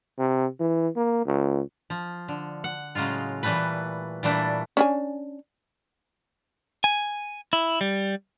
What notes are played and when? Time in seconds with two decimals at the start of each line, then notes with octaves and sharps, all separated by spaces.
0.18 C3
0.60 E3
0.96 A#3
1.26 C#2
1.90 F3
2.28 D3
2.64 F#5
2.95 A2 C#3 F#3 G#3 F4
3.43 A#2 E3 G3 A3 B4
4.23 A#2 E3 G3 A3 D4 E4
4.77 C#4 D4 G#5
6.84 G#5
7.53 E4
7.81 G3